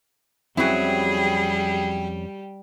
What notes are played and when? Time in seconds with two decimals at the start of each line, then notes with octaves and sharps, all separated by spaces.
0.57 F2 F#3 G3 C4 C#4 E4 G4 G#4